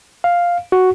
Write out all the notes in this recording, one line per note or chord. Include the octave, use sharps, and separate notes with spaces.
F5
F#4